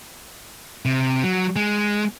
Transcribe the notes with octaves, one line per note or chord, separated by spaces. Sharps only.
C3
F#3
G#3